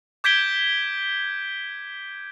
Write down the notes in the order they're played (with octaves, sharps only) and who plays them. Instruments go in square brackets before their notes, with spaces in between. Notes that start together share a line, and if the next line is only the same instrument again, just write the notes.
[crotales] D6 G6 G#6 B6 D7 G7